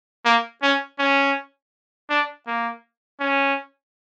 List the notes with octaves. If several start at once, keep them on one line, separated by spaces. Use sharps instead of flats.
A#3
C#4
C#4
D4
A#3
C#4